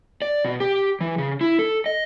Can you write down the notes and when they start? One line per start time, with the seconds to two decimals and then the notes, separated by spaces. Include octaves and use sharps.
0.22 D5
0.45 B2
0.60 G4
1.01 E3
1.18 C#3
1.41 E4
1.59 A4
1.86 D#5